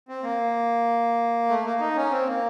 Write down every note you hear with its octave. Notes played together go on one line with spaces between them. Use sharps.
C4
A#3
A3
A#3
D#4
C#4
C4
A#3